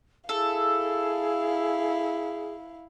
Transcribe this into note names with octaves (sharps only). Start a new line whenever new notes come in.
E4 G#4 A4 F5